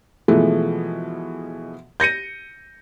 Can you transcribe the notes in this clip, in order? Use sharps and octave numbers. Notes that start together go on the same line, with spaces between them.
B2 E3 F3 G#3 A3
G6 A#6 C#7 D#7